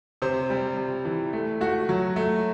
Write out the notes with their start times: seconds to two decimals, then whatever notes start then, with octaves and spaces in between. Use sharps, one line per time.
0.22 C3 C5
0.50 G3
0.77 C3
1.05 E3
1.33 A3
1.61 A3 F#4
1.89 F#3
2.16 A3